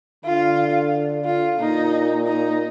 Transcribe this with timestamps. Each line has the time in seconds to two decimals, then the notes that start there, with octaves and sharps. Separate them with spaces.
0.25 D3 F4
1.25 F4
1.59 A#2 D#4
2.27 D#4